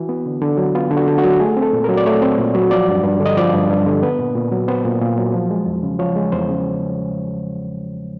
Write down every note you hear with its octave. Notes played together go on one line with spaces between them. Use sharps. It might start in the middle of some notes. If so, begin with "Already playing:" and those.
Already playing: E3 F#4
B3
D3
D3
F#3
B3 F4
D3
F#4
D3
F#4
F#3
A3 G#4
C4
A4
A#2
F#3 A#4
D5
A3 C#5
C4
A#2
F#3
F3 D5
G2
G2
D3
D#5
F3 D5
G2
G2
D3
B3 B4
A#2
A#2
F#3
B3 C5
A#2
A#2
F#3
F3
G#3
E2
C#3
F3 C#5
G#3
E2 C5
C#3